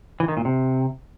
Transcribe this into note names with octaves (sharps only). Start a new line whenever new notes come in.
E3
D#3
A#2
C3